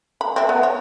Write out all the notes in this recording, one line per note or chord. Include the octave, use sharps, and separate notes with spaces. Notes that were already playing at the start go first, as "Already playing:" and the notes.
B5
C4 E5
B3
C#5